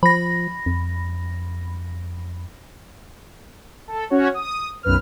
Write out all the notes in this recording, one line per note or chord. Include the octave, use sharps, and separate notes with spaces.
F3 B5 A#6
F2
A4
C#4 F#4 C#5
D#6
B1 F#2 B4 F6